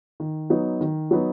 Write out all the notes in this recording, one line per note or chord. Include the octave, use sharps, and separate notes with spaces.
D#3
F#3 B3 D#4
D#3
F#3 B3 D#4